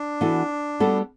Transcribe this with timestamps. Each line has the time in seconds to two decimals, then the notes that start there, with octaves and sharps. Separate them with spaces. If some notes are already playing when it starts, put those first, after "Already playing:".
Already playing: D4
0.21 E3 B3 F#4 A4
0.80 G3 B3 F#4 A4